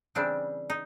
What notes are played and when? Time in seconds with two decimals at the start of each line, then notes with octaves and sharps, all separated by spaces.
0.15 C#3 E3 G3 C4 D4
0.70 D#4